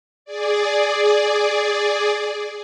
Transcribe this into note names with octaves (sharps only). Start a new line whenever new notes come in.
G#4 D5